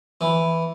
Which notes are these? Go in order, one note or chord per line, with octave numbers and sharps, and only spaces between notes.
E3